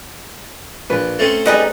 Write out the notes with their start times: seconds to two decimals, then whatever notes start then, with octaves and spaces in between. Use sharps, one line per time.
0.90 A#1 B4
1.19 A3 C4 C#4
1.46 G3 D#4 G#4 B4 D#5